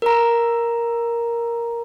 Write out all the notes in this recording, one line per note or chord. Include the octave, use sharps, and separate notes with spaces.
A#4 A#5